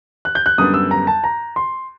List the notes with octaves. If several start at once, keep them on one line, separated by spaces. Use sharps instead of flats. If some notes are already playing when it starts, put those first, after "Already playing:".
F#6
G6
F#6
F#2 D3 G3 B3 D4 D#6
E6
A#5
A5
A#5
C6